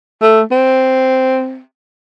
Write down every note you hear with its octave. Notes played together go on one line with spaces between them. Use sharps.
A3
C4